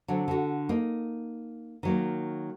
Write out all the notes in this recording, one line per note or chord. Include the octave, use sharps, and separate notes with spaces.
D3 F#3 C4
D3 F#4
A#3 D#4
D#3 F#3 A#3